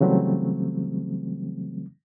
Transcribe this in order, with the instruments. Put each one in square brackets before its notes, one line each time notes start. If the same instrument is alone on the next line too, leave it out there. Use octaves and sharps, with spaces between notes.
[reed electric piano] C#3 E3 F#3 G3 A3 C4